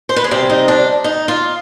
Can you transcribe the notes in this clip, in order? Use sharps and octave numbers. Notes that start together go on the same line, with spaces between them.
C5
B4
G#4
C3 G3 C4 G4
D#4
D4
D#4
F4